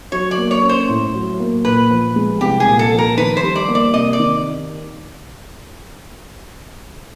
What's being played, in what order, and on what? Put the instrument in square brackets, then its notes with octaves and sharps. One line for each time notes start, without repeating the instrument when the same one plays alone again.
[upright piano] F#3 [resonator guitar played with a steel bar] C#5
[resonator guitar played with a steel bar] D5
[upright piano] A#3
[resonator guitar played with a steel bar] C#5
[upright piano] C#4
[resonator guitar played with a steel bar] C5
[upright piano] A2
F#3
A#3
[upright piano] A#2 [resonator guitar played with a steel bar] B4
[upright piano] F3
G#3
[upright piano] C2 [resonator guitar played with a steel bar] G4
[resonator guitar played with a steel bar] G#4
[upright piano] A#2
[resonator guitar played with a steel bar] A4
[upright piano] F3
[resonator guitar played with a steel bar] A#4
[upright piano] D#3 [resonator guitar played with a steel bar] B4
[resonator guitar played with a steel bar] C5
[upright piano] G3
[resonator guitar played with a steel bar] D5
[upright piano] A#3
[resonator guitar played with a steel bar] D5
[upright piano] C3 [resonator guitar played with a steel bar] D#5
[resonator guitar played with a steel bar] D5
[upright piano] D#3